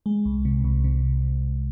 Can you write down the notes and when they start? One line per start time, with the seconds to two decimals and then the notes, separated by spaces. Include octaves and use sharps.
0.06 G#3
0.25 C2
0.45 C3
0.65 C2
0.84 C3